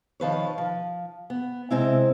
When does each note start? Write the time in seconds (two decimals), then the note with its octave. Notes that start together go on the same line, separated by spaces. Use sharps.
0.20 D#3 F3 B4 C#5
0.58 F3
1.30 B3
1.71 C3 G#3 C4 E4